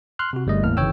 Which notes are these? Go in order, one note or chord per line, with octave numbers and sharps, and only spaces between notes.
C6 F6 F#6
C3 F#4
G1 G3 A3 D#5
E2 A2 A#3 F6
G1 C#3 E3 C#5 G5 E6